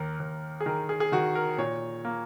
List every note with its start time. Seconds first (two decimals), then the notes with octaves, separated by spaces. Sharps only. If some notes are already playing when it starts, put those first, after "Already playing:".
Already playing: D#2 A#4
0.20 D#2
0.60 G#4
0.66 D#3 A#4
0.89 G#4
1.00 G#4
1.12 D#3 F#4
1.35 A#4
1.58 A#2 C#5
2.05 A#3